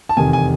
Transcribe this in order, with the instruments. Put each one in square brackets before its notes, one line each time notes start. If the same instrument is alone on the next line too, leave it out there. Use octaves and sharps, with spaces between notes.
[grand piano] A5
F1 E2 C3 D#3 G#5
G#5